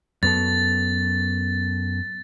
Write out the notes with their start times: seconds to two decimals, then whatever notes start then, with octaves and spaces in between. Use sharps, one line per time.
0.23 F#2 B3 A4 A6